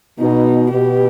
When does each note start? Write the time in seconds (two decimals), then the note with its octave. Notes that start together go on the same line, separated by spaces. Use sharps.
0.19 B2 D#4
0.70 B2 G4